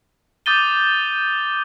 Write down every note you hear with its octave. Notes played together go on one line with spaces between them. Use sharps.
D6 D#6 G6 A6 D#7 G7